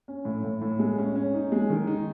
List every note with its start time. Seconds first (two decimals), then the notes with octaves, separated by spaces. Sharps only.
0.08 C#4
0.25 A2
0.44 A2
0.62 A2
0.79 G#3
0.98 C#4
1.16 C#4
1.34 D#4
1.52 G#3
1.70 D#3
1.87 D#4